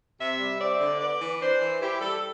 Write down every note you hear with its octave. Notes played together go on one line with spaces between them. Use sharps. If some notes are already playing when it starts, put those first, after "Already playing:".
C3 E5
G3
C4 D5
D3
B3 D5
E3
D4 C5
E3
E4 G4
G3 A4